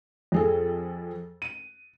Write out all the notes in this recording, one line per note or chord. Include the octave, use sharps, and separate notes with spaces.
F2 G#4 A4
D#7